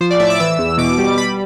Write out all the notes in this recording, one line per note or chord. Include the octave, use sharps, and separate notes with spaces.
F3 C5
D5
A2 E5
D6
E3 E6
E2
B2 D6
G3
G3 B5